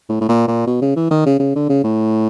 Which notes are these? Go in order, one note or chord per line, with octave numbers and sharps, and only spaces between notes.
A2
A2
A#2
A#2
B2
C#3
E3
D#3
C#3
C#3
D3
C#3
A2